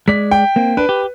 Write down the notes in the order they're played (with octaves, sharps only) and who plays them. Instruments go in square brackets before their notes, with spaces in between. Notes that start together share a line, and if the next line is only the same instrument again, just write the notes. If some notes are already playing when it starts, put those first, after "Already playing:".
[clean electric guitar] G#3 D5 [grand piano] B6
[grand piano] G5
[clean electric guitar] A#3 C4
[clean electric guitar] D4 [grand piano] B4
[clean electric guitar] G4